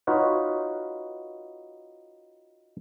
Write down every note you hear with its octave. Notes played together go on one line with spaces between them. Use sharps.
D#4 F4 F#4 B4 C#5